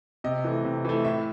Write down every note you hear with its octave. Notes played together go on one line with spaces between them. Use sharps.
C3 D#5
E3 A3
C3
E3 A3
A2 E5